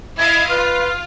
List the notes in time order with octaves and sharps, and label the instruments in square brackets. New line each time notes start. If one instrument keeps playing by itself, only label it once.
[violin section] E4 D#5 F5 [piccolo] G#6
[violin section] F4 [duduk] B4 [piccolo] F6